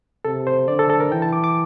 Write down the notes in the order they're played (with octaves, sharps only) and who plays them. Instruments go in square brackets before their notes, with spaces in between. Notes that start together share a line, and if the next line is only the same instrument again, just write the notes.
[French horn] C3 [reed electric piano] A4
[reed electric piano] C5
[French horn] D3 [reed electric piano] D5
[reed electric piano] A4
A4
A#4
[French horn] E3 [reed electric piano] G5
[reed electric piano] A5
D6
D6